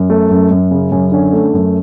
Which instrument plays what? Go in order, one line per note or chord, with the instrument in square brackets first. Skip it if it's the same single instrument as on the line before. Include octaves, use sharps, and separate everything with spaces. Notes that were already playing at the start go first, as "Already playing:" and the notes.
Already playing: [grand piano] F#2
A3
F#2
F#2
C#3
F#2 C#4
D3 C#4
A3
F#2